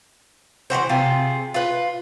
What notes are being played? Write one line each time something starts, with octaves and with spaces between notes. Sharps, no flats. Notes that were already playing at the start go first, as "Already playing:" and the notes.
E3 F#3 F#4 C5
C3 F4 G#4
F4 B4